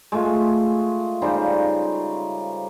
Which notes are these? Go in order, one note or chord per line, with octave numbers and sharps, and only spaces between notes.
G#3 A3 F4
C#3 G3 D#4 C5